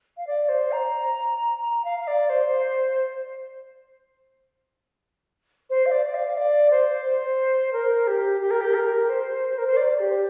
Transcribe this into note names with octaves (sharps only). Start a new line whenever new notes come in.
F5
D5
C5
A#5
A#5
F5
F5
D5
C5
C5
F5
D5
D5
F5
F5
D5
C5
C5
A#4
G4
G4
A#4
G4
A#4
C5
A#4
C5
D5
G4